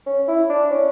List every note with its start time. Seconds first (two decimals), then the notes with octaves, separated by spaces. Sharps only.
0.06 C#4
0.28 E4
0.49 D4
0.71 C#4